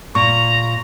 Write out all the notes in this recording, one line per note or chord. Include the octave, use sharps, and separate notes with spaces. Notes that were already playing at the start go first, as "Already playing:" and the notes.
A#2 A#5 C#6